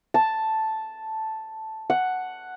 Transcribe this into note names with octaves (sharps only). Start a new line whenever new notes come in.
A5
F#5